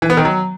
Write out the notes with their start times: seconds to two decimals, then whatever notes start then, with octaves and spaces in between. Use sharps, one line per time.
0.02 E3
0.10 B3
0.17 D#3
0.25 F#3